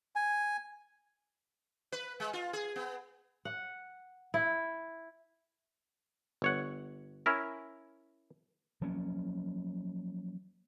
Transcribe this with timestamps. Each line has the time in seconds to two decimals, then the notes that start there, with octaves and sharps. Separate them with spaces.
0.15 G#5
1.92 B4
2.20 G#3
2.33 F4
2.53 G#4
2.76 B3
3.45 F#5
4.34 E4
6.42 G1 C#5 F#5
7.26 C#4 E4 A#4
8.81 F3 F#3 A#3 C#4